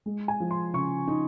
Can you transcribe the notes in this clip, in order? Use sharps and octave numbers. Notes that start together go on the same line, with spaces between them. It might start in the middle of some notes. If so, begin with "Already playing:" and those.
G#3
G#5
F3
C6
C#3 C#6
D#4